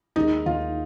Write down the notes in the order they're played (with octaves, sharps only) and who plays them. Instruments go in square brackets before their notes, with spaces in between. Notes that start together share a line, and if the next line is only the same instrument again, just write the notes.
[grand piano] D#2 D#3 G#3 [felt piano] D#4
[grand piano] D#2 D#3 G#3 [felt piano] F4